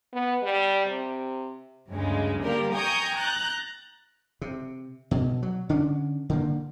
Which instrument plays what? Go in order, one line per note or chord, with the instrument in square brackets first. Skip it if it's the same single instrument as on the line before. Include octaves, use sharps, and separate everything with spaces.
[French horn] B3
G3
C3
[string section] D2 G2 C#3 G#3
D3 G3 A#3 G4 A#4
G5 G#5 A#5 C#6 D#6 G6
A#5 F#6 G6 A6
[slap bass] C3
B2
F#3
D3 C#4 D4
D3 D#3 A#3